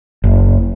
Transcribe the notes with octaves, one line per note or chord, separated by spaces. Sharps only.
F#1